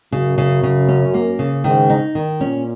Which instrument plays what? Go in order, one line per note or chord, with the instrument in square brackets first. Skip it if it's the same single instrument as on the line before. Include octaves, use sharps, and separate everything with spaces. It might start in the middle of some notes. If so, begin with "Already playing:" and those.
[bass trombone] F#2 [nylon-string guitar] C#3
[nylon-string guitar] C#3
C#3
C#4
A#3
C#3
[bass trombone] G#2 [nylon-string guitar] D#3
[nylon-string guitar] D#4
D#3
[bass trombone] A#2 [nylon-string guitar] C#4